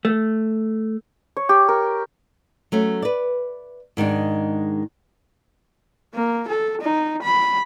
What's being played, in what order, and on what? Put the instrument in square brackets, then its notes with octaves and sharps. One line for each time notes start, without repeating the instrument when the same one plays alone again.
[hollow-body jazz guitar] A3
[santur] C#5
G4
A#4
[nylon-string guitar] F#3 A3 C#4
B4 D5
G#2 D#3 G#3 D4
[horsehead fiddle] A#3
A4
D#4
B5